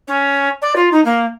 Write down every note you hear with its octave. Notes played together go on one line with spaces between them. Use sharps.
C#4
D5
F4
D#4
A#3